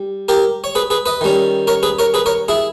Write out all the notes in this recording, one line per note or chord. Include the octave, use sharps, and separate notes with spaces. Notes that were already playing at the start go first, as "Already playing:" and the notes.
Already playing: G3
G4 A#4
C#5
G#4 B4
G#4 B4
B4 D#5
D#3 G3 C#4
A#4 C#5
G#4 B4
A#4 C#5
G#4 B4
A#4 C#5
E4 G#4